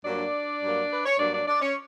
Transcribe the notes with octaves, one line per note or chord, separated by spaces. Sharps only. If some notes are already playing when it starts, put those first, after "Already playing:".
G2 F#3 A#3 D4 D5
G2 F#3 A#3
B4
C#5
G2 F#3 A#3 D4 D5
D4 D5
D4 D5
C#4 C#5